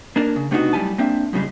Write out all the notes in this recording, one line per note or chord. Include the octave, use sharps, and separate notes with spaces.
A#3 D4 A#4
C#3
C3 A3 B3 D4 D#4 F#4
F#2 G3 A3 E4 G#5 A5
A#3 C4 D4 E5
F#2 A2 C#3 G3 G#3